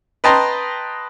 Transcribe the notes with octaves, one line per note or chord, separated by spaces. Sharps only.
B4 D#5 G5 A5 A#5 C6